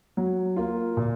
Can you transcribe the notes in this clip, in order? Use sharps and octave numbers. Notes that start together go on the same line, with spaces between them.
F#3
A#3 F4
A#2